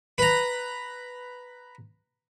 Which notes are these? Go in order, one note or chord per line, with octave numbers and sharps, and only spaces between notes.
B4 A#5